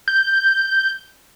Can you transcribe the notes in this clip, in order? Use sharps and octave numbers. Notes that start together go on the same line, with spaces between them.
G6